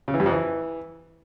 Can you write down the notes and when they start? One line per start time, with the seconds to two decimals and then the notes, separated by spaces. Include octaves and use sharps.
0.08 C#3
0.14 E3
0.20 G2
0.26 F2
0.32 E3